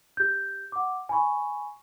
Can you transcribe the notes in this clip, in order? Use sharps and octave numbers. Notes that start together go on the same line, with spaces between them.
G4 G6
F#5 D6
G#5 B5 C#6